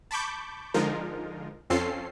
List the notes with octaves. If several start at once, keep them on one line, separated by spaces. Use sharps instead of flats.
A5 B5 C#6 D6 G6
D3 F3 G#3 D#4 F4 A#4
F2 C4 C#4 F4 A4 C7